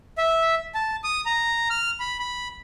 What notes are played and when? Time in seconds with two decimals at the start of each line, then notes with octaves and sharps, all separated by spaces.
0.18 E5
0.75 A5
1.04 D#6
1.26 A#5
1.70 F6
2.00 B5
2.19 B5